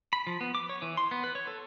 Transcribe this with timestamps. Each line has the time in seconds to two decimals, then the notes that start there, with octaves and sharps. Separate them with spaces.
0.13 B5
0.27 F3
0.41 B3
0.55 D6
0.69 C#5
0.82 E3
0.97 C6
1.11 B3
1.24 B4
1.35 C#5
1.47 A4